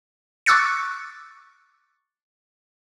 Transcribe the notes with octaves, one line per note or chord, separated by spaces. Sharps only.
C#6 D6 E6 F#6 A6 C#7